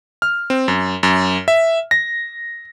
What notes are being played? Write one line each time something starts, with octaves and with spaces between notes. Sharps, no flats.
F6
C4
F#2
F#2
E5
A#6